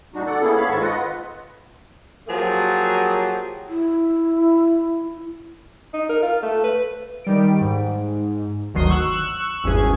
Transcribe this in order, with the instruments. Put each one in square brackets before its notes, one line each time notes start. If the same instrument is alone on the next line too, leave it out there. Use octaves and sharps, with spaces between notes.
[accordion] A#2 G3 D4 D#4 F#4
D3 A4 D5 F#5
A#3 B3 C#4 E4 G#4 A4
B3 C#5 F5 B5
G#2 D#3 G#3 A4 A5 C#6
F4 B4 D#5 F#5
[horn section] F3 F#3 A#3 G4 G#4
[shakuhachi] E4
[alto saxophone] D#4
A#4
F4
A3
B4
[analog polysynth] D#3 G3 D7
G#2
G1 D2 D#3 F#3 C6 D#6
C#6 E6 F#6
G#1 E2 G2 C#4 G#4 G#6